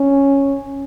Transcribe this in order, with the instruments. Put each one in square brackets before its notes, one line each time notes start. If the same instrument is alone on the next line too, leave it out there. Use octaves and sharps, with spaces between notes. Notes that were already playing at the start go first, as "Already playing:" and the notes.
Already playing: [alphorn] C#4